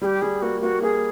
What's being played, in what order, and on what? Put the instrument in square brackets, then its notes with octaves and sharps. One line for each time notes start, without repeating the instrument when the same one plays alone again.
[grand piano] G3 [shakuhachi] G#4
[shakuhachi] G4
[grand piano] G3 [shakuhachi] G#4
[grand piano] A#3 [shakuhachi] F#4
[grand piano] A#3 [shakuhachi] F#4
[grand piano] A#3 [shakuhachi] G#4